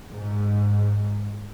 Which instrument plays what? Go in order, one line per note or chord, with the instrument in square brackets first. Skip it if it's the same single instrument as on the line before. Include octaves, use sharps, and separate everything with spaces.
[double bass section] G#2